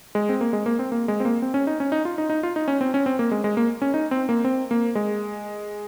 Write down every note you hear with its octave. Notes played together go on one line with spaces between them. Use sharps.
G#3
C4
A#3
G#3
A#3
C4
A#3
G#3
C4
A#3
C4
C#4
D#4
C#4
D#4
F4
D#4
D#4
F4
D#4
C#4
C4
C#4
C4
A#3
G#3
G#3
A#3
C#4
D#4
C4
A#3
C4
A#3
G#3